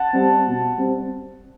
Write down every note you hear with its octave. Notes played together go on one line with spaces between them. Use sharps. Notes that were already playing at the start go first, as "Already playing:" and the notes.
Already playing: F#5 A5
G3 C4
B2
G3 C4